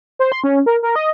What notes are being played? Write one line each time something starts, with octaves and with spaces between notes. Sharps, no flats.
C5
C6
C#4
A#4
A#4
D#5